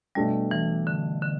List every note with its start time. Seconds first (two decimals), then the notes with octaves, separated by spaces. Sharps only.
0.15 B2 G3 A3 D4
0.51 E3
0.87 D3
1.22 D3